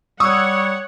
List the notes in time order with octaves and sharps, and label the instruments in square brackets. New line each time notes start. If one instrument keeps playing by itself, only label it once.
[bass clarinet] G3 [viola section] C#5 F#5 [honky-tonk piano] C#6 D#6 E6